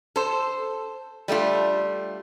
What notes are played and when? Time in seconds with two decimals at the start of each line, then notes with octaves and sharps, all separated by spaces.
0.16 A4 C5
1.28 G3 A3 D4 F4